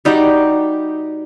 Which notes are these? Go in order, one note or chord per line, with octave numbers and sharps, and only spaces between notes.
G3 D#4 F#4 G4